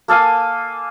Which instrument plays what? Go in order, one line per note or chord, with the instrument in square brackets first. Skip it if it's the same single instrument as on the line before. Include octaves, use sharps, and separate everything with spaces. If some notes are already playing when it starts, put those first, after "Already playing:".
[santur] A#3 A4 F5 G#5